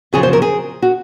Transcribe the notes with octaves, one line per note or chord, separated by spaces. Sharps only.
F#2 C#3 F3 G#4
C5
A#4
G#4
F#4